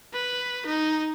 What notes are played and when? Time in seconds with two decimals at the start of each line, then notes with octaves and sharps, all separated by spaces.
0.13 B4
0.66 D#4